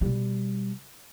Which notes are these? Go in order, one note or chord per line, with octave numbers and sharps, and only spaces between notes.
B2 G3